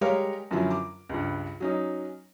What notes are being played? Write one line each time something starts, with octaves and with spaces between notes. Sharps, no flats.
G3 G#3 G4 A#4 C#5 F5
F#2 D3 F3 F#3 E4
D6
C#2 G2
F#3 C#4 D#4